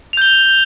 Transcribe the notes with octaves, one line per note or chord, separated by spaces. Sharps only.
G6 F7 G7